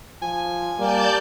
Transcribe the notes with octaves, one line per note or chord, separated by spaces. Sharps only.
F3 G#5
G3 A#3 D5 A5 G6